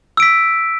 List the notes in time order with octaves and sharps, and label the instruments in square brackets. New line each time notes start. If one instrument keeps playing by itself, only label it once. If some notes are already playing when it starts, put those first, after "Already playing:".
[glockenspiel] E6
D7
B6